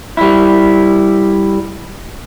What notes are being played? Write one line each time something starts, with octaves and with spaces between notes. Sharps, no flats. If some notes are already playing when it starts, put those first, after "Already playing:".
G3 E4